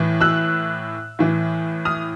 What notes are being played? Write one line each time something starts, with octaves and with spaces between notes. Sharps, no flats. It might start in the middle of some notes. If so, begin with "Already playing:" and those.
Already playing: A2 E3
E6 F#6
A2 E3
D#6 F6